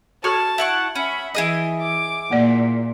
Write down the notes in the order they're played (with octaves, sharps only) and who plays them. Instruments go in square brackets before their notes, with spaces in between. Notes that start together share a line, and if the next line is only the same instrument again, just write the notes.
[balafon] F#4 A4 [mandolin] C#5 C#6 F6 [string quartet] A5
[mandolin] E4 F#5 C#6
[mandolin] C#4 [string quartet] E5 F#5 B5
[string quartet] E3 [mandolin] E4 G#4 D#5
[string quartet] D6
[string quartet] A#2 [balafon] A#3 D5